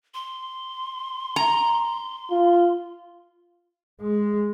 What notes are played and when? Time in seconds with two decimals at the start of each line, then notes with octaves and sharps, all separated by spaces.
0.14 C6
1.36 A#5
2.31 F4
4.01 G#3